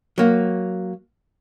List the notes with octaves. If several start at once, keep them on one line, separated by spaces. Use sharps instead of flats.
F#3 A#3